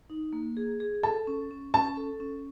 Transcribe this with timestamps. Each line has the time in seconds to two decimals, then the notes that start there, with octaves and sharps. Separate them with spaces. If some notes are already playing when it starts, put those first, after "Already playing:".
0.10 D#4
0.33 A#3
0.57 G#4
0.80 G#4
1.03 A4 A5
1.27 C#4
1.51 C#4
1.74 C#4 A5
1.97 A4
2.20 C#4